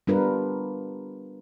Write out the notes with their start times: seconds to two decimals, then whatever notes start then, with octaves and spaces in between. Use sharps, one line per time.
0.07 G3 B3 D4 F4 A#4 B4